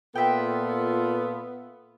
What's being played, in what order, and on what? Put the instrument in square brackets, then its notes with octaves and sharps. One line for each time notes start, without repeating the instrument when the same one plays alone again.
[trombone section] A#2 F4 A4 [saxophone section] B3 [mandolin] E5 G5